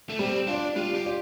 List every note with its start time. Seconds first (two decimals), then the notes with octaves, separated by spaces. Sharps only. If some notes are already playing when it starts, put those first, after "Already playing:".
0.10 A3
0.19 G3 C4
0.47 D4 F4 D5
0.76 G3 F4
0.95 G4
1.05 F4 D5